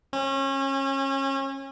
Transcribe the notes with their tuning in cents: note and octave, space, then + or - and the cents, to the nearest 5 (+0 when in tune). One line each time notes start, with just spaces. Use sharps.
C#4 -30